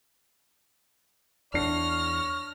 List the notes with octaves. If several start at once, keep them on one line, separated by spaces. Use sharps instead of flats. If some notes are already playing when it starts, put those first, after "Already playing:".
E2 D4 C#5 F6 A#6 C7